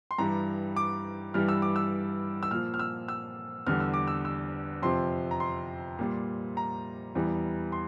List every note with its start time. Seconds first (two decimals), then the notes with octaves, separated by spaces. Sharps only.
0.11 C6
0.18 G2 E3 G3 A#5
0.76 D6
1.34 G2 E3 G3 F6
1.48 E6
1.62 D6
1.76 E6
2.43 E6
2.51 A#2 F3 F6
2.74 F6
2.79 E6
3.08 E6
3.67 E2 D3 G3 F6
3.80 E6
3.94 D6
4.07 E6
4.25 E6
4.82 F2 C3 F3 C6
5.31 A#5
5.40 C6
5.99 A#2 G3
6.57 A#5
7.15 E2 E3 G3
7.72 C6